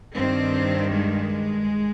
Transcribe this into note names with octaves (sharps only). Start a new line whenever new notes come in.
G2 D#3 C4
G#3